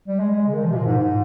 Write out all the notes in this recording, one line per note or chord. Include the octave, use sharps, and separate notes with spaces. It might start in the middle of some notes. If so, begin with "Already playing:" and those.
G3
G#3
G#3
C#3
D#3
F3
C3
A#2
G#2
G#2